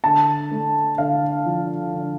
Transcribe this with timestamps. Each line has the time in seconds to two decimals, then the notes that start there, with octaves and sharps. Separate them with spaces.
0.04 D3 A5
0.51 A3
0.98 D3 F5
1.46 F3
1.94 D3